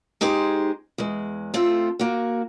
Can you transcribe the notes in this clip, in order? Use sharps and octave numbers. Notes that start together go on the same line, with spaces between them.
G#3 D#4 G4 G#4 C5
E2 G#3
A3 C4 F4 A4
A#3 F#4